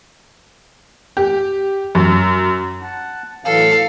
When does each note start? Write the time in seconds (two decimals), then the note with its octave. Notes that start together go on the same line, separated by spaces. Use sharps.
1.17 G4
1.95 F#2
2.82 F#5 A5
3.45 A2 E3 F#3 A4 F5